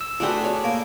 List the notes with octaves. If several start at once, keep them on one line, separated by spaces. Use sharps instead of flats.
E6
A3 D4 F4 F#4 G#4 B4 G5
C#5 D5
A#3